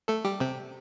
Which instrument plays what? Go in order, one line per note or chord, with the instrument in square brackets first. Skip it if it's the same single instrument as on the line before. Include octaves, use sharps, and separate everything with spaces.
[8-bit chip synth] A3 A4
G3 G4
C3 C4